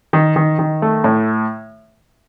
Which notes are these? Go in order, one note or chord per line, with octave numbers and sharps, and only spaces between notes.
D#3
D#3
D#3
A3
A2